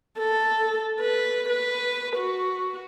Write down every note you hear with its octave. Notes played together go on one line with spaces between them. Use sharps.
A4
B4
B4
F#4